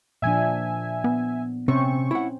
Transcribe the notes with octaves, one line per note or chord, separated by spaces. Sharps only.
A#2 F3 D4 E5 G#5
B3
C3 C4 C#4 C5 C#6
E4 F#5